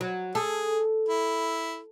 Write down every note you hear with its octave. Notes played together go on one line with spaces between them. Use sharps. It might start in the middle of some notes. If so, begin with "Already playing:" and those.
F#3
G#4 A4
E4